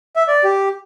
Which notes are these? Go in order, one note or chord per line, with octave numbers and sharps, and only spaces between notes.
E5
D5
G4